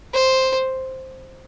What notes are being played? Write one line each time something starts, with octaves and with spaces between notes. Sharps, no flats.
C5